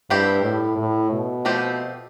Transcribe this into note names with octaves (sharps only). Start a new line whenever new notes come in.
G2 G3 C4 E4 G4
A2
A2
B2
F3 A3 C4 G4